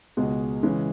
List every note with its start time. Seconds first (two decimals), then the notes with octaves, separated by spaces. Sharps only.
0.17 C#2 B2 G#3
0.63 C#3 E3 G#3